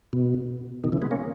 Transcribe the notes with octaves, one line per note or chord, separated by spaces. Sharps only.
B2
B2 D#3
C#3 E3
G#3 B3
A#3 C#4